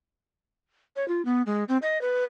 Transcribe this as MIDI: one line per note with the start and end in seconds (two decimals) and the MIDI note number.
0.96 1.07 73
1.08 1.24 65
1.25 1.42 59
1.46 1.64 56
1.69 1.77 60
1.82 2.00 75
2.01 2.24 71